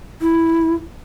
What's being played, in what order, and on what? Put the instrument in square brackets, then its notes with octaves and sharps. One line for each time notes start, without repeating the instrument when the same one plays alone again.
[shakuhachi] E4